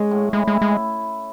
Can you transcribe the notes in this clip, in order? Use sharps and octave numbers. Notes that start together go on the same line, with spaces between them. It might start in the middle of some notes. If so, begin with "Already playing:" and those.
Already playing: G#3 C#4
A2
G#3 E4
G#3
E4
G#3